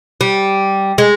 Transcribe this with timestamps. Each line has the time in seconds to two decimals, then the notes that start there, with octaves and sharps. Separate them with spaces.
0.21 G3
0.98 G#3